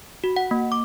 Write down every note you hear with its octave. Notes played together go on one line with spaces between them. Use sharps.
F#4
F#5
A#3
D6